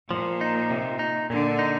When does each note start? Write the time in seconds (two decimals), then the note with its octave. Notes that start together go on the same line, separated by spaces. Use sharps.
0.11 A#2 F3
0.41 D#4
0.71 C3
0.99 D#4
1.30 A#2 D3
1.59 D#4